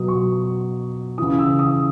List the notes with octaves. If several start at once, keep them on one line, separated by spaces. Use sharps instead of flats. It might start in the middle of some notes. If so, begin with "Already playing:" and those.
Already playing: B2 F#3 D#6
C#6
C#3 E3 D#6
E6
D#6